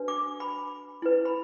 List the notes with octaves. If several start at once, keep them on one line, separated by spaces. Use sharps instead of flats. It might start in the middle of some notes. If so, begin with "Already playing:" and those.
Already playing: D4 F#4 B4
D6
B5
E4 B4
B5